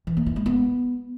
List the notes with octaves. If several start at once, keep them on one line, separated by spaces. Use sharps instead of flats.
E3
A#3
E4
G#3
B3